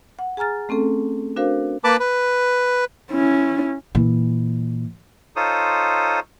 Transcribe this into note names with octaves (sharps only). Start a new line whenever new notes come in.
F#5
G#4 G#5 A#5 F6 A6
A3 C4 C#4 A4
D4 F#4 A#4 C5 F5
A#3 B4 A5 B5 D6
B4
C#4 E4
A#2 E3
D#4 F4 A4 C5 C#5 D#6